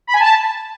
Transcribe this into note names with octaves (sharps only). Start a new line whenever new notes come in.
B5
G#5
A5